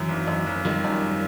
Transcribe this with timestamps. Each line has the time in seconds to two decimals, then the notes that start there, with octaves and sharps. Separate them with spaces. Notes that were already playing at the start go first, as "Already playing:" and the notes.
Already playing: F#2 E3 F#3
0.09 G#1
0.27 F#2
0.47 G#1
0.65 D#3 F3 G3
0.84 F#2